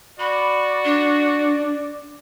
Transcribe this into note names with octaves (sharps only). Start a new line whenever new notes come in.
F#4 D5 B5
D4